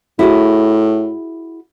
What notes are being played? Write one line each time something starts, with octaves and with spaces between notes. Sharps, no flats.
A2 E4 F#4 G#4